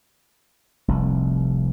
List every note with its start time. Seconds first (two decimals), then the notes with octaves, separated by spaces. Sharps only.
0.88 F1 C2